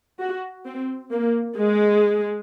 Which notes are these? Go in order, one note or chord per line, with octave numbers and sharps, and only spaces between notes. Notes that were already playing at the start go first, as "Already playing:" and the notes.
F#4
C4
A#3
G#3